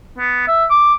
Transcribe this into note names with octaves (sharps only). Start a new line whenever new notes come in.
B3
E5
D6